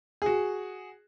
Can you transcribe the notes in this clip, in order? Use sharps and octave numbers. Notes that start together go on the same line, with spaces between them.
F#4 G#4